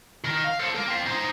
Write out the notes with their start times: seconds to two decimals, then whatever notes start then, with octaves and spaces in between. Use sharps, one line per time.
0.24 D#3 A#4
0.44 F5
0.59 A4 C5
0.75 A#3 A#4
0.88 C4 F5
1.06 D#4 C5